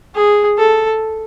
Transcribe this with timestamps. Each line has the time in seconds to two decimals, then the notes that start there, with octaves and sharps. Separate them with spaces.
0.15 G#4
0.58 A4